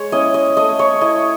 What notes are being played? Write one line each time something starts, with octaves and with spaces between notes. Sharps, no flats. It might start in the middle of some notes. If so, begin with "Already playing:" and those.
Already playing: G#3 C#5
C#4 E4 D#5
D#5
A3 D#5
C#5
E4 D#5